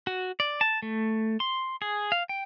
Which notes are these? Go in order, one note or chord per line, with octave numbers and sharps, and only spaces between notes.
F#4
D5
A5
A3
C6
G#4
F5
G5